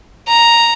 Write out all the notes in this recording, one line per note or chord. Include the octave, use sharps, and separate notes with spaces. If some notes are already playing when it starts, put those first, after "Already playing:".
A#5